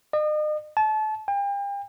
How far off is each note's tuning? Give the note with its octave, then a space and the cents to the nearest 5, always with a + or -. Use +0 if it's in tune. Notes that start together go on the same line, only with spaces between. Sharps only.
D#5 -40
A5 -30
G5 +40